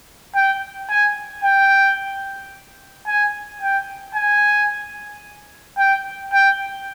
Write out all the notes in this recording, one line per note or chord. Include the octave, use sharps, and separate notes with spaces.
G5
G#5
G5
G#5
G5
G#5
G5
G5